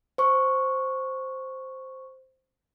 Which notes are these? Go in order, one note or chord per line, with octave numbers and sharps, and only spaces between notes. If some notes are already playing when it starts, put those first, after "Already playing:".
C5 C#6